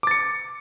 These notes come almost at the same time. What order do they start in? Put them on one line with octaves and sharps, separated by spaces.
D6 A6 C#7